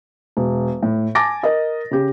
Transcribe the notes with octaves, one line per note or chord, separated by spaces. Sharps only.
E1
A2
G#5 A5 D6 A6 A#6
A#4 D#5
C#3 G4